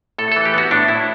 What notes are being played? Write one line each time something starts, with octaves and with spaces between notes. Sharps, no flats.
A2 A4
A4
E3
G4
B3 F#4
A2 D4
A2 E4